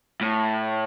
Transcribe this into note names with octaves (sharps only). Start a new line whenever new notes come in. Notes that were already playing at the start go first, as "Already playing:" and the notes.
A2